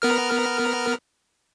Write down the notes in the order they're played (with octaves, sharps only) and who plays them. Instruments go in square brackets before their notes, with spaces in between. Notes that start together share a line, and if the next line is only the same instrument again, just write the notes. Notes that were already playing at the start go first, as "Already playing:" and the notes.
[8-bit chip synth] B3 A#4 F6